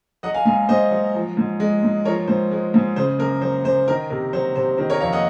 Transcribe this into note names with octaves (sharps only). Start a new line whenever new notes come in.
F#3 D#5 F#5
F5 G#5
G#2 F5 G#5
G#2 C5 D#5
F#3
F3
G#2
G#3
G#2
F3 A#4 C#5
G#2 C5
G#3
G#2
C#3 C5
F#2 A#4
F#3 C5
F#2 C5
D#3 A#4
C3 A#4
F#3 C5
C3 C5
D#3 C5
A#4 C#5
F2 C#5 F5
D#5 F#5